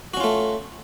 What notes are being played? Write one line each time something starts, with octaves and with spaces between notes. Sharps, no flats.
A3 C#4 F4 F#4